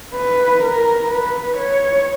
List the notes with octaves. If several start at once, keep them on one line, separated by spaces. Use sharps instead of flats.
B4
A#4
B4
C#5